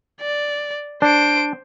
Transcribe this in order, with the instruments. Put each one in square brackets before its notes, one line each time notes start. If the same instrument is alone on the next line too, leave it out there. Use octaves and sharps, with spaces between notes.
[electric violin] D5
[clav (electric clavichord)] D4 [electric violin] C5 D7